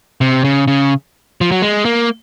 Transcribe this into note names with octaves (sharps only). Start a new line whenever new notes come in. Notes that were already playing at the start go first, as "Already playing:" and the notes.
C3
C#3
C#3
F3
F#3
G#3
A#3